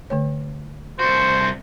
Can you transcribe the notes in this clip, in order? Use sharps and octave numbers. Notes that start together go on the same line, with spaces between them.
D3 A3 C#5
C2 F#4 C5